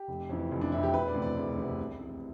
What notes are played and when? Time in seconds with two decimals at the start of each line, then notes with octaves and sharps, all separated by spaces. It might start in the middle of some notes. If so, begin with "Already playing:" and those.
Already playing: G4
0.08 F1
0.30 F2 E3
0.52 F1
0.61 D4
0.72 F2 E3 E4
0.83 G4
0.93 E1 B4
1.08 D5
1.14 D2 C3 E3
1.22 D5
1.37 E1
1.58 D2 C3 E3
1.79 C2
2.00 C3 E3